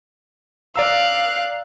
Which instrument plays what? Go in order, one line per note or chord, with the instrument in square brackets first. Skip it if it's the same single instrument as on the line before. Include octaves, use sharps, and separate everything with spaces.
[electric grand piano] D5 A#5 E6 [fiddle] F5 F#6